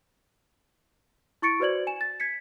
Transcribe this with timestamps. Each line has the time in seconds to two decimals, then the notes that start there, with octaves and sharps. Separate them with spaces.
1.42 E4 C#6 A6 C#7 D7
1.60 F#4 B4 C5 D5 G#6 F#7
1.87 G#5 E7
2.01 A6
2.20 G#6 B6 C#7